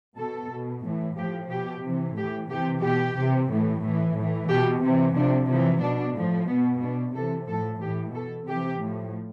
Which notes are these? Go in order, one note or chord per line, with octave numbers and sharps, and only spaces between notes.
B2 A4
B2
A2 E3
A2 F3 G4
B2 G4
C3 E3
A2 E3 G4
C3 E3 G4
B2 G4
C3 E3
A2 E3
A2 E3
A2 E3
B2 G4
C3 E3
C3 F3 D4
C3 E3 F3
B2 D4
A2 F3
B2 B3
B2 D4
C3 E3 A4
F3 A4
A2
A2 E3 G4
B2 A4
C3 E3 G4
A2 F3